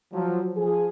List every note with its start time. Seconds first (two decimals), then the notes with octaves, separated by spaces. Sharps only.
0.12 F3 F#3
0.56 F3 G#4